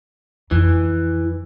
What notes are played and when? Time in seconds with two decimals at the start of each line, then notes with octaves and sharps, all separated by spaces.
0.51 F2 E3